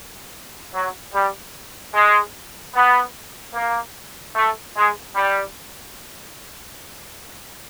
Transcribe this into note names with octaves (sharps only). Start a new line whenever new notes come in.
F#3
G3
G#3
B3
A#3
A3
G#3
G3